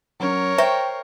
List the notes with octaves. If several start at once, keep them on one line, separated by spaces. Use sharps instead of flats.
F#3 C#4 A#4 C#5
C5 E5 G5 A#5 C#6